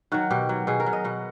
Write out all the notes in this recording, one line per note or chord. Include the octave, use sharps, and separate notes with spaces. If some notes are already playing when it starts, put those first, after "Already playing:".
D#3 F#3 F#4
B2 G4
F#3
B2 G#4
A#4
F#3
D#5
B2 F#5